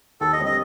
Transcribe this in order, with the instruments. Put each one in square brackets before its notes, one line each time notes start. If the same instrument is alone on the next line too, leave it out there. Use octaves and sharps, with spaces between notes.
[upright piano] D#2 [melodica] A4
[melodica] D#5
[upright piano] D3 G3 C4
[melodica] D#5